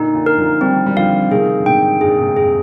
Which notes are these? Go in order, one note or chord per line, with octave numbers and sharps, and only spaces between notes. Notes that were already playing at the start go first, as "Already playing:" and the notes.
Already playing: A#2 D3 D#4
A#2 D3
A#4
D3 F3
D#3 G3 C4
G3
D3 F3 F5
C3 D#3 G#4
D3
G#2 C3 G5
G2 A#2 G#4
G#2 C3
F2 G#4